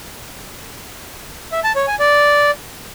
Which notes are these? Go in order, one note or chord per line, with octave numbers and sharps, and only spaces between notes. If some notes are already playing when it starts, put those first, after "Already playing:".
E5
A5
C#5
G#5
D5